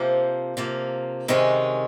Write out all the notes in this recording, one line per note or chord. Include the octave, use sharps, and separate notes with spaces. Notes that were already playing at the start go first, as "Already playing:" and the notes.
Already playing: C3 F3 A#3
C3 F3 A#3
C3 D#3 G#3 C#4